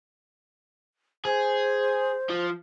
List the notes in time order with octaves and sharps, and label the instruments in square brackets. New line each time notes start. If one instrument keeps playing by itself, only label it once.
[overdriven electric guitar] G#4 [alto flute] C5
[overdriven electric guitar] F3